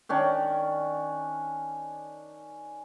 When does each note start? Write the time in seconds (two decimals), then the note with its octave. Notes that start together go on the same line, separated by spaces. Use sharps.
0.09 D#3 C#4 D4